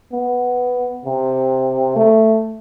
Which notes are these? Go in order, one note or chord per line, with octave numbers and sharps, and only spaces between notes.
B3
C3
A3